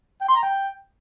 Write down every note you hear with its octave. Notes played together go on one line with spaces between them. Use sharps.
G5
C6
A#5
G5